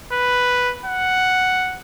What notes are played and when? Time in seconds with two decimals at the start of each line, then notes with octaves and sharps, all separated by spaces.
0.12 B4
0.86 F#5